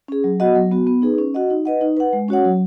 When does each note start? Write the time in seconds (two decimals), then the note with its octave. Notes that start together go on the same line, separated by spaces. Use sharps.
0.08 C#4 G#4
0.24 F#3
0.40 B3 F#4 D#5 F#5
0.55 F#3
0.71 B3 F#4
0.87 B3
1.02 D#4 G#4 B4
1.18 C#4
1.34 F#4 D#5 F#5
1.50 D#4
1.65 B4 D#5 F#5
1.81 D#4
1.97 B4 F#5
2.13 G#3
2.28 C#4 F#4 C#5 F#5
2.45 F#3